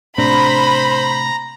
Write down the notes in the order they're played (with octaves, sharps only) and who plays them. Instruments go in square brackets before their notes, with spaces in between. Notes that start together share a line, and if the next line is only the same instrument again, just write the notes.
[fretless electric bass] A2 C3 D4 [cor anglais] C5 [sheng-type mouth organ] A#5 [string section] B5